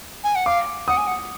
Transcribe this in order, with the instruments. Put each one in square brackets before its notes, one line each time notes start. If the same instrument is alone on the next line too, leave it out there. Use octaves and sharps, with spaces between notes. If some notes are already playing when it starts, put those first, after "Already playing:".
[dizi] G#5
F#5
[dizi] F5 [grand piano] D6
[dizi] F#5 [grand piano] D#6
[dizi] G#5
F#5